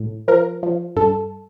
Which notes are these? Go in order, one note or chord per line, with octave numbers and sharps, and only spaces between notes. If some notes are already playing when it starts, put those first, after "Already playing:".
Already playing: A2
F3 A#4
F3
G2 A4